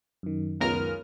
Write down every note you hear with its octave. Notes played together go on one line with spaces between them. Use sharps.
F#2 D#3
C#2 B3 C#4 F4 A#4 F6